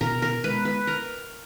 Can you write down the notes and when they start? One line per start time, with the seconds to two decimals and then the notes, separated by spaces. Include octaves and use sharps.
0.01 B2 A#4
0.22 A#4
0.44 G#3 B3 B4
0.65 B4
0.87 A#4